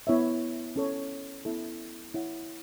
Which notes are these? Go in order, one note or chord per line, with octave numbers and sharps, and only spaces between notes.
B3 E4 C#5 E5
C#4 A4 C#5
B3 E4 A4
E4 C#5 F#5